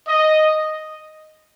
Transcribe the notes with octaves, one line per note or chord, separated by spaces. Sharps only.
D#5